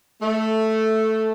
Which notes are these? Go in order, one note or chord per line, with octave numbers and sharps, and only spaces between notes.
A3